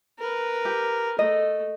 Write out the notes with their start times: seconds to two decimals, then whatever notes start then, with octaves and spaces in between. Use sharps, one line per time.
0.19 A#4 B4
0.65 G4
1.19 A3 D#5